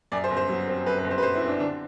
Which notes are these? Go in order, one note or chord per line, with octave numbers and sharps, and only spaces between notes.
F#2 D5
C5
G1
C5
F#3
C4
F#2 B4
B4
G1
C5
B4
F#3 C5
E4
C4
D4
D3 D4